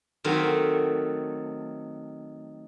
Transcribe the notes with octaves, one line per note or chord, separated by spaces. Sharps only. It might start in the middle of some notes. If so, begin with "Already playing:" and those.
D#3 F#3 A3 C4